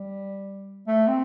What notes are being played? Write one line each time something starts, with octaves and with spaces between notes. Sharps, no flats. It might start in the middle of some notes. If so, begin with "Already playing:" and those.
Already playing: G3
A3
C4